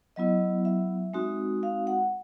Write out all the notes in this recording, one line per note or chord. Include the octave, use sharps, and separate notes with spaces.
F#3 B3 E4 D#5
E5
G#3 C4 D#4 F#4
F5
F#5